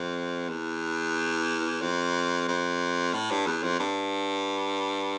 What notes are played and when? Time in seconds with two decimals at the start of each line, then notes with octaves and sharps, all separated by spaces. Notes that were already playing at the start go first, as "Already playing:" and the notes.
Already playing: F2
0.49 E2
1.81 F2
2.48 F2
3.14 A2
3.31 G2
3.46 E2
3.63 F2
3.80 G2